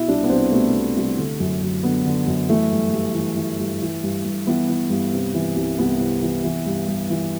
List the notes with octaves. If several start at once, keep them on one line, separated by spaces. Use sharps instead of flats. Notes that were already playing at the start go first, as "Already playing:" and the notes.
Already playing: B2 E4
C2 D4
B3
C2 C4
B2 A3
B2
C2
D3
F#2
F#2
D3 B3
D3
F#2
E3 A3
G2
G2
E3
E3
G2
E3
G2
G2
E3 B3
E3
G2
C3
E3
C2
C2 B3
C3
E3
E3
G2
G2
E3